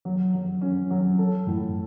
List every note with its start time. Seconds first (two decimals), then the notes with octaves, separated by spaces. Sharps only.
0.05 F#3
0.34 F#3
0.61 C#4
0.91 F#3
1.19 A4
1.47 A2